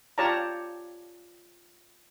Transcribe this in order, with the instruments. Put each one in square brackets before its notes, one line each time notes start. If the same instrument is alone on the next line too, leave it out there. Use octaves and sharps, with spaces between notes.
[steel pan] F4 G4 C#5 D5 A5 A#5